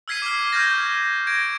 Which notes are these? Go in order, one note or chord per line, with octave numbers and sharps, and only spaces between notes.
E6 F6 G#6 B6 C7 D#7
D6 F6
C#6 F6 G6 G#6 A#6
G#6 A#6 D7